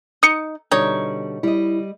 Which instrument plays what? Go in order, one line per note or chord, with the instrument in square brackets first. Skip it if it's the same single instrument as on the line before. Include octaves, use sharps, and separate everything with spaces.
[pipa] D#4 [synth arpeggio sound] D#6 C#7
[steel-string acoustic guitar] B2 D3 G3 [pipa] D#4 C#5
[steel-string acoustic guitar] G3 D#5 [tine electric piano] E4